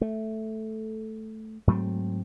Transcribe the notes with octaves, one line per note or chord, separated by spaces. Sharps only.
A3
G#2 F#3 A3 C4